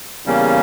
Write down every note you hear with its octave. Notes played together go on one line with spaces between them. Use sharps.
E2 C#3 G3 A#3 C#4